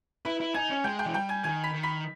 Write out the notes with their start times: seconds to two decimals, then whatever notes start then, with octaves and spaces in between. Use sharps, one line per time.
0.25 E4 B4 B5
0.40 E4
0.54 D#4 G#5 G#6
0.70 C#4
0.84 G#3 G5 G6
0.99 G5 G6
1.06 E3
1.14 G3 G5 G6
1.29 G#5 G#6
1.44 D#3 G#5 G#6
1.64 B5 B6
1.74 D#3
1.83 B5 B6